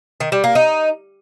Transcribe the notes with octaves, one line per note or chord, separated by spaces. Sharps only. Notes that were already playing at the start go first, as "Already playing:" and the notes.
D#3
G3
A#3
D#4